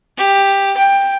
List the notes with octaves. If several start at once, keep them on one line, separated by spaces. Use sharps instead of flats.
G4
G5